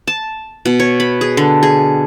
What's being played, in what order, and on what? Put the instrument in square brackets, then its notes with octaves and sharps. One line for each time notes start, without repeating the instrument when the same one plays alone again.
[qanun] A5
B2
C#5
B5
G#4
D3
G#4